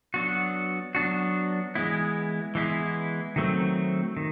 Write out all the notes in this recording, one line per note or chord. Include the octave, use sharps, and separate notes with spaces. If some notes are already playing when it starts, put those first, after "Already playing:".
F#3 B3 D4 F#4
F#3 B3 D4 F#4
E3 G#3 B3 E4
E3 G#3 B3 E4
D#3 F#3 A3 C4
D#3